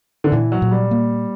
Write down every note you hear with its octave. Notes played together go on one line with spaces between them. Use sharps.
D3
A#2 E3
F#3
A#2
G3
A#3